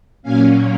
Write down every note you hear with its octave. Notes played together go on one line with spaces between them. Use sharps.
A#2 F#3 A#3 C#4 F5 G#5